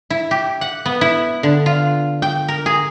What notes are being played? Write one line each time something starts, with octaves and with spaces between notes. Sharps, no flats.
E4
G4
F#5
B3
E4
D3
F4
G5
A#4
G#4